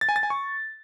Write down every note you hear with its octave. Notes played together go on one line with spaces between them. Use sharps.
A6
G#5
A6
G#5
C#6